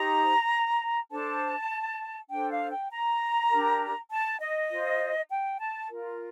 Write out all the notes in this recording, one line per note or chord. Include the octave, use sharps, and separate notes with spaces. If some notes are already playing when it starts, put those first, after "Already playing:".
Already playing: D#4 G4 C5 A#5
D4 A4 C5 A5
D4 A4 C5 G5
F5
G5
A#5
D4 G4 A#4
A5
D#5
F4 C5
G5
A5
F4 A#4